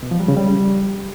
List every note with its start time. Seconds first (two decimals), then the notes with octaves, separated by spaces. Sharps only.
0.03 B2
0.11 F3
0.20 G3
0.28 C#3
0.37 G3